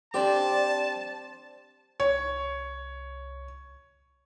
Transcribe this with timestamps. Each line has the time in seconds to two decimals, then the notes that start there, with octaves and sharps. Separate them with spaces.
0.14 C4 D4 G4 C5 D5 A5
2.00 C2 C#5